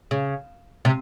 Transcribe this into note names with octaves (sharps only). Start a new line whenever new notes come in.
C#3
C3